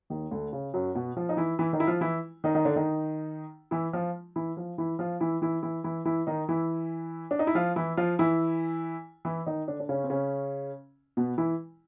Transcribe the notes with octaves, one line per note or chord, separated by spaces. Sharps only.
D#2 D#3
D2 D3
C#3
F#2 F#3
B2 B3
F3 F4
D#4
E3 E4
E3 E4
D#3 D#4
E4
F3 F4
E3 E4
D#3 D#4
D#3 D#4
D3 D4
D#3 D#4
E3 E4
F3 F4
E3 E4
F3 F4
E3 E4
F3 F4
E3 E4
E3 E4
E3 E4
E3 E4
E3 E4
D#3 D#4
E3 E4
D4
D#4
E4
F3 F4
E3 E4
F3 F4
E3 E4
E3 E4
D#3 D#4
D3 D4
D4
C#3 C#4
C4
C#3 C#4
B2 B3
E3 E4